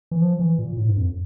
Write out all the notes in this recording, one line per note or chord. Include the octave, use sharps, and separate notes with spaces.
E3
F3
E3
A#2
A2
G2
F2